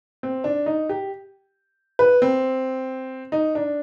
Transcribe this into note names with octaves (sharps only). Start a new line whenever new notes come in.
C4
D4
D#4
G4
B4
C4
D#4
D4